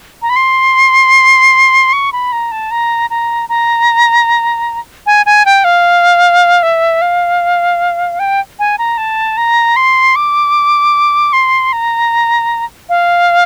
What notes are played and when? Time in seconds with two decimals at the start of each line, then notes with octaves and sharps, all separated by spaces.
0.22 A#5
0.29 B5
0.36 C6
1.93 C#6
2.12 B5
2.32 A#5
2.52 A5
2.71 A#5
3.10 A#5
3.49 A#5
5.06 G#5
5.26 G#5
5.45 G5
5.64 F5
6.63 E5
7.02 F5
8.19 G5
8.59 G#5
8.78 A#5
8.98 A5
9.37 A#5
9.76 C6
10.16 D6
11.33 C6
11.73 A#5
12.89 F5